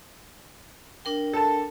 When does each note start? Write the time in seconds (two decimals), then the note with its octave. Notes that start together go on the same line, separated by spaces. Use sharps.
1.05 D4 A#4 G5
1.33 A4 A5